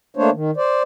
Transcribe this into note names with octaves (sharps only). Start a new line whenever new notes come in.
A3 A#3 D4 C5 C#5
D#3
C5 D5